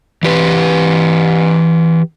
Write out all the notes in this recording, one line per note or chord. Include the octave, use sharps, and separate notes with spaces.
E3 G4 B4